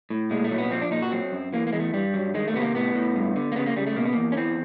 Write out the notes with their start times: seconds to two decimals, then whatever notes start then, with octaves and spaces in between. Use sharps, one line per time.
0.10 A2
0.31 A#2 G#3
0.44 A3
0.51 F#3
0.58 B3
0.71 F3 C4
0.82 D4
0.91 A#2 D#4
1.02 F#4
1.12 F#3 C4
1.32 F#2
1.53 E3 A#3
1.67 A#3
1.73 E2 G#3
1.80 A3
1.93 G2 G3
2.14 F#3
2.34 D#3 G#3
2.48 A3
2.54 C3 B3
2.61 A#3
2.74 A2 B3
2.95 A2
3.16 G2
3.36 D3
3.52 A#3
3.56 C#3 B3
3.66 A#3
3.76 C#3 G3
3.87 A3
3.96 B2 A#3
4.05 B3
4.13 E2 A#3
4.32 C#4
4.37 E3 C4